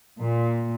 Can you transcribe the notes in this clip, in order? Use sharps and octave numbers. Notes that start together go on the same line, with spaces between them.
A#2